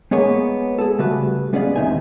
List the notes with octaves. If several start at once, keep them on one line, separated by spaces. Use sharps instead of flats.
G#3 A#3 B3 G#4 C#5 G#5
G#4 A4
C#3 G3 A3 F#4 B4
G#3 B3 C#4 G#4 D5 F5
D#2 C3 F#3 D#4 E5 G#5